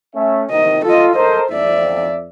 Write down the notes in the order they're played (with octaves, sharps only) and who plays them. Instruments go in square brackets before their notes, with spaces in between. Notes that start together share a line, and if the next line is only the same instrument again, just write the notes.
[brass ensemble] A3 C#4 E5
[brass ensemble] C3 D#3 [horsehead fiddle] D#5
[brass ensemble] F4 [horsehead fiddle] A4 D#5
[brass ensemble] A4 A#4 C5 [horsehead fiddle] D#5
[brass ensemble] F2 [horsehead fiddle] D5 E5